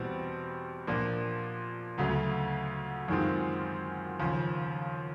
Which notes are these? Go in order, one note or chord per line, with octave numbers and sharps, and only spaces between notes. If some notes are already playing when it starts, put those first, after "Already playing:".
Already playing: E2 B2 G3 C4
A#2 F3 A#3 D4
D2 C#3 F#3 A3
F#2 D#3 G#3 C4 F4
D#2 C#3 F3